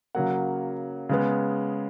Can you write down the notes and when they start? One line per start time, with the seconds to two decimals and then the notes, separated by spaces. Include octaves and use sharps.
0.15 C#3 F#3 A#3 F#5
1.09 C#3 G#3 B3